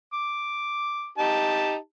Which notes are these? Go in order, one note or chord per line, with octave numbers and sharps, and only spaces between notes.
D6
D#4 G4 A5